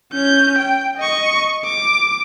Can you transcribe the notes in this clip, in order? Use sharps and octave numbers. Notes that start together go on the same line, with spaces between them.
C#4 G6
G5
D#5 C#6
D6